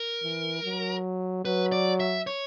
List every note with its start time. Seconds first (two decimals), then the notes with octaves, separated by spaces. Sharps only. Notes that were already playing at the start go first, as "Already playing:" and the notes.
Already playing: A#4
0.22 E3
0.63 F#3
1.45 F#3 B4
1.72 D5
2.00 E5
2.27 C#5